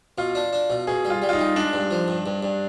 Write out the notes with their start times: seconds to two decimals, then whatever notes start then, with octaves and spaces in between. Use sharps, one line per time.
0.18 B2 F4
0.35 D4
0.53 D4
0.70 B2
0.87 B2 G#4
1.05 G3
1.10 F4
1.22 G3
1.29 F4
1.33 D#4
1.39 G3
1.56 G#3 D4
1.73 G2
1.91 F3
2.08 G2
2.26 G2
2.43 G2